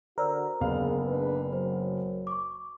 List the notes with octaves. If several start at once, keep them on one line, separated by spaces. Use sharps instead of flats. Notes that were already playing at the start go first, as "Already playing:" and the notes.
D3 F#4 A#4 C5 D5 E6
F#1 D3 B3 G#4 F5
D4 B4
F#3 C5
C#6 D6